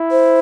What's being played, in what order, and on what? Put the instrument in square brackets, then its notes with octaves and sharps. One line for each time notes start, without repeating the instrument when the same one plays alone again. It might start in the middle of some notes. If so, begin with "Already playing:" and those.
Already playing: [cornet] E4
[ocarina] C5